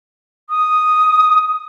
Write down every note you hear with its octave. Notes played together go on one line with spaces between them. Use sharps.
D#6